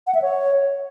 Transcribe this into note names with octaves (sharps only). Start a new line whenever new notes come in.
F#5
E5
C#5